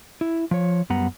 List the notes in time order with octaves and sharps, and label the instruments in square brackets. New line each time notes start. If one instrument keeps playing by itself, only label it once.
[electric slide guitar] E4
F3 C#5
F#2 G3 B3 F#5 A#5